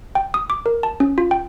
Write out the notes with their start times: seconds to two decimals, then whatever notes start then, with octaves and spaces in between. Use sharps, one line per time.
0.15 G5
0.34 D#6
0.50 D6
0.66 A#4
0.83 A5
1.00 C#4
1.18 F4
1.31 G5